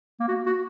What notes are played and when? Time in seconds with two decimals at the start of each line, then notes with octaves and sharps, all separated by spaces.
0.20 A#3
0.28 F#4
0.46 F#4